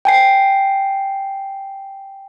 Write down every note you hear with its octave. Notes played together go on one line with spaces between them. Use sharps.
G5 G#5 C7